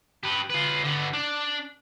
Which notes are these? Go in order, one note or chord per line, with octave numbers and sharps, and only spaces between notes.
G4 B4
F4 B4
D3 B3
D4